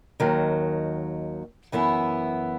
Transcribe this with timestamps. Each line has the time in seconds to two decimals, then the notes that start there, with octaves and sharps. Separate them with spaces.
0.20 D#2 D#3 F#3
1.72 F#2 E3 B3 E4